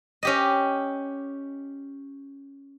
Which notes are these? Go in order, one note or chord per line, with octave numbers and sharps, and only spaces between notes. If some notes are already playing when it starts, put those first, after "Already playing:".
C#4 G4 D#5